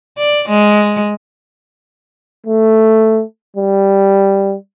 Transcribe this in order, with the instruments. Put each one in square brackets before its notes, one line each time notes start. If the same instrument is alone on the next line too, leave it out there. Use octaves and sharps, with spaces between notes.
[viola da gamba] D5
G#3
[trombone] A3
G3